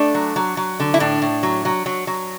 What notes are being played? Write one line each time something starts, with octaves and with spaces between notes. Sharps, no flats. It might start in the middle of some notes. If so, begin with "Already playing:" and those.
Already playing: A3 D4
F#3
F#3
F#3
D3
E4
A2 D4
A2
F#3
F#3
F#3
F#3